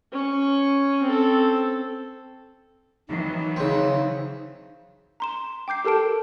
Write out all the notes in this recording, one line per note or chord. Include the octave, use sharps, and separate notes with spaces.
C#4 C#6
C4 A4
D#3 E3 F#3 D#4
C#3 C4
A#5 C6 E7
G5 D6 G6 C7
G4 A4 A#4 A5 D7